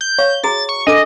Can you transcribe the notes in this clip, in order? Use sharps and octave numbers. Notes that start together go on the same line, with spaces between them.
G6
C#5 F5 C#6
F#4 G#4 A#5 A6
C#6
D4 A4 D#5 D6